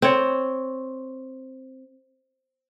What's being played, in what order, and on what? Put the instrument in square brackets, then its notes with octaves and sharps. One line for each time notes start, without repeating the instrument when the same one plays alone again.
[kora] C4 C#5